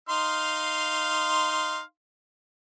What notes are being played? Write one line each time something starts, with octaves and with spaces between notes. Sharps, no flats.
D#4 F5 C6